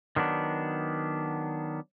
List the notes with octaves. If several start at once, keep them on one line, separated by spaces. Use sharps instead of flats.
D#3 F#3 B3 D4